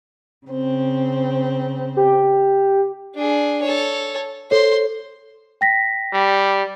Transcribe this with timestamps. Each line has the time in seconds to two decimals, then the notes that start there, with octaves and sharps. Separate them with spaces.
0.46 C#3 C4
1.97 G4
3.15 D4 G#4
3.62 A4 C#5
4.51 A4 C5 C#5 C6
5.61 G5 A#6 B6
6.13 G3